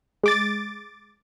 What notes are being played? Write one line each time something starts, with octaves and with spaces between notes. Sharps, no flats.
G#3 D6 A6